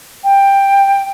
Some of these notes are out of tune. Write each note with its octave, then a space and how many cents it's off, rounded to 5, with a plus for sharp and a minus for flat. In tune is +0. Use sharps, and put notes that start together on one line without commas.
G5 +10